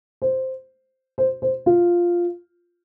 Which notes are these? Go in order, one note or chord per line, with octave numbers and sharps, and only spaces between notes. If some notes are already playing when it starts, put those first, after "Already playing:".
C5
C5
C5
F4